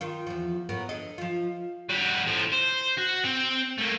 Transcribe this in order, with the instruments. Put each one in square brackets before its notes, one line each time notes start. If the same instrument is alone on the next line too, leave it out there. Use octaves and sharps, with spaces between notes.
[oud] D#3 F4
E2 F3
A2 B3 A#4
D3 A4 D#5
F3 F4
[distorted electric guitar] G3 F#4
A2 F3
C5
F#4
C4
A3 A#3